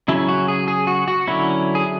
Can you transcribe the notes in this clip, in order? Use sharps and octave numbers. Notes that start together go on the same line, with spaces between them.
C#3 F#3 C#4 E4
F#4
G#4
G#4
F#4
F#4
D3 F#3 C#4 E4
G#4